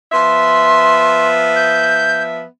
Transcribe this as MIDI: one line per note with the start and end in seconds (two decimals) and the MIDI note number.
0.12 2.43 53
0.12 2.43 59
0.12 2.43 76
0.12 1.28 84
1.56 2.23 91